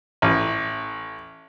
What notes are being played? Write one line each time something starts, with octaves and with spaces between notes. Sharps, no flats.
A1